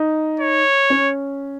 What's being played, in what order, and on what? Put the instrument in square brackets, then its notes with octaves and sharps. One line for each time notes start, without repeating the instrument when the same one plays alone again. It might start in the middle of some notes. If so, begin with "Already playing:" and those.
Already playing: [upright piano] D#4
[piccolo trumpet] C#5
[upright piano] C#4